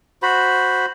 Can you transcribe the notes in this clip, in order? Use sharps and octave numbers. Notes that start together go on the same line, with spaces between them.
F#4 C5 B5